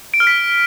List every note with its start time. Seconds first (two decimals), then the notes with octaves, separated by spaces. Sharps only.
0.14 D7
0.20 F6
0.27 B6